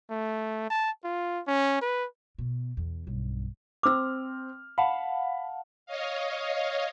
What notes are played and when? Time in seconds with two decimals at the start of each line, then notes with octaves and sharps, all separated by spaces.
0.10 A3
0.70 A5
1.04 F4
1.48 C#4
1.81 B4
2.38 B2
2.77 E2
3.07 B1 G2
3.83 C4 D6 E6 F6
4.78 F5 F#5 A5 B5
5.86 C#5 D#5 F5